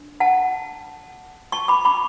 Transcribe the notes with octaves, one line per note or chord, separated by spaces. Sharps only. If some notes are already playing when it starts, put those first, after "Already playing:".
Already playing: D4
F#5 A5
A5 C#6
B5 D6
B5 D6